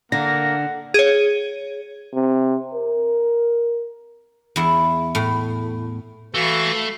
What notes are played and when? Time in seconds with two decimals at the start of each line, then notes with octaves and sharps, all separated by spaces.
0.12 D3 A#3 F#5 A#6
0.94 G#4 C#5
2.14 C3
2.74 A#4
4.56 E2 E4
5.15 A2
6.34 E3 A3 F#4 F5 B5 C#6